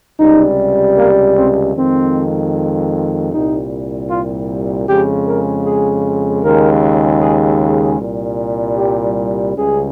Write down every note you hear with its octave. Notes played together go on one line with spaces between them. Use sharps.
C#2 C3 G3 D#4
A#3
C4
F2 D#3 G#3 C4
C2 A#2 G3 D#4
F4
F2 C#3 G#3 G4
A#4
G#4
D#2 C#3 G#3 A#4
G#4
G#4
C2 A#2 G3
G4
C#2 C#3 G3 G#4